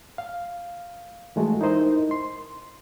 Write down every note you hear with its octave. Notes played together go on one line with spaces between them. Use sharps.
F5
E3 G#3 A3 F#4
D#4 E4 A#4 C5 D#5
C6